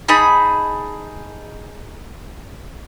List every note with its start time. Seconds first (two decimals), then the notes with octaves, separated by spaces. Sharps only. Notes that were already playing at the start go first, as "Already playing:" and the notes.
0.08 D#4 G#4 A5 B5